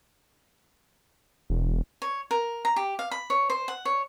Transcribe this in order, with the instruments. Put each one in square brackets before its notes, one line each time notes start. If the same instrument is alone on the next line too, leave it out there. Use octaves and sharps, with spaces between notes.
[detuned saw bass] E1
[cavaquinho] C#5
A#4
A#5
G4
F5
B5
C#5
C5
F#5
C#5